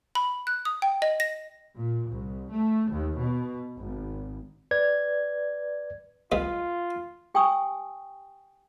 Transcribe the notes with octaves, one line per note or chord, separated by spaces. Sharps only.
B5
F#6
D#6
G5
D#5
A#6
A#2
C2
A3
D#2
B2
G#1
B4 D5 G#6
C2 G#3 B3 F4
G4 G5 G#5 C#6 D#6 E6